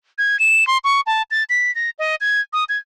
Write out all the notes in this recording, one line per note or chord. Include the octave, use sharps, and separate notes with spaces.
G#6
E7
C6
C#6
A5
A6
B6
A#6
D#5
G#6
D#6
G#6